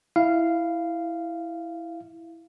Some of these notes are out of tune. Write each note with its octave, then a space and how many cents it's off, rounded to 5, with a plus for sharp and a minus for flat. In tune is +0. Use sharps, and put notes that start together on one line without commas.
E4 +0 F5 -10